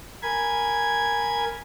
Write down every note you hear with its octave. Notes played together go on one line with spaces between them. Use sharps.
A#4 G#5 B5 G#6